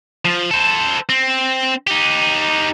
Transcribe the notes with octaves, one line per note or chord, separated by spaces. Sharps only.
F3
A4 C5
C4
D#4 G4